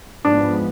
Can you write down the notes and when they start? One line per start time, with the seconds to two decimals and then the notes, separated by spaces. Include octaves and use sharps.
0.24 G#2 F3 G#3 B3 D4